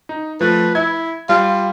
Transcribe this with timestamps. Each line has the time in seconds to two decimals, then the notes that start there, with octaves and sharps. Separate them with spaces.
0.09 D#4
0.41 F3 A3 B4
0.75 E4 G#6
1.29 G3 F4